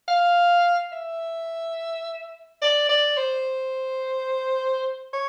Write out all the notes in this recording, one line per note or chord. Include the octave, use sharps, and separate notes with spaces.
F5
E5
D5
D5
C5
C#5